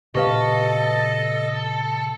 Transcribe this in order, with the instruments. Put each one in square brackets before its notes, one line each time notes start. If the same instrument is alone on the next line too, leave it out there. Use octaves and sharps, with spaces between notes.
[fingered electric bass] A#2 C#3 B3 [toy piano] G4 B4 F5 [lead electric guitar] A4 [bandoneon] D#5